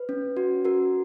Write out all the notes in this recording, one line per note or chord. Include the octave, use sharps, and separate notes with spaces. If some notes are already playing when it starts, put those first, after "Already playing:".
Already playing: B4
C#4
F#4
F#4 A#4